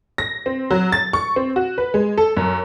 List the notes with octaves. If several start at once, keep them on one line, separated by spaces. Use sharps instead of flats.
A#6
C4
F#3
A6
C#6
C4
F#4
B4
G#3
A4
F#2